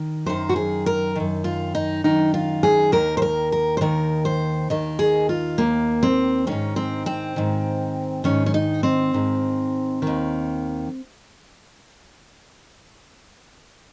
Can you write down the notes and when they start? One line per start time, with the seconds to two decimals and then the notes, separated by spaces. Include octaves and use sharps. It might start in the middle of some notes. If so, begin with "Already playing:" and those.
Already playing: D#3
0.26 F#2 D#3 C5
0.49 F#4
0.56 G#4
0.86 A#4
1.16 F#2 D#3
1.44 F4
1.75 D#4
2.04 F#2 D#3 D#4
2.34 F4
2.63 G#4
2.92 D#2 D#3 A#4
3.17 C5
3.22 A#4
3.52 A#4
3.77 C5
3.81 D#2 D#3 A#4
4.25 C5
4.70 D#2 D#3 D#5
4.99 G#4
5.29 F4
5.58 D#2 D#3 A#3
6.03 C4
6.47 G#2 D#3 C#4
6.76 C4
7.06 C4
7.36 G#2 D#3
8.24 G#2 D#3 C#4
8.46 C#4
8.54 D#4
8.83 C4
9.14 G#2 D#3
10.02 D#2 D#3